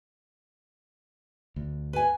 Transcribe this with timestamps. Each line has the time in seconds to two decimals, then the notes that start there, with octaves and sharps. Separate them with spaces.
1.56 D2
1.93 B4 G#5